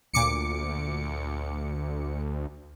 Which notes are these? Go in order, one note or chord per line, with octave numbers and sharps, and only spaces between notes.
D2 A#2 D6 C#7